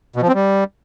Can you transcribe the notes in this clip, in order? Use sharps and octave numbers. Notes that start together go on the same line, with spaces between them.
B2
F3
C4
G3